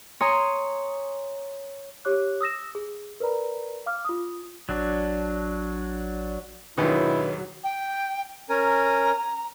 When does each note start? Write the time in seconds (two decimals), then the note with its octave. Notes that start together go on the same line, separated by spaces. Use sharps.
0.20 C#5 G#5 A#5 C6 D#6
2.05 G4 C#5 D6 F#6
2.41 D#6 E6 A#6 E7
2.75 G#4
3.20 A#4 B4 D5 A#5 B5
3.86 F5 D6 F6
4.05 F4 D#6
4.69 A1 F#3 D4
6.78 D#2 G#2 B2 D#3 F#3 D4 E4 B4
7.63 G5
8.49 C#4 A#4 G#5 A#5